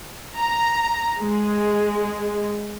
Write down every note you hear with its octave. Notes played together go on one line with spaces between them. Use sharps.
A#5
G#3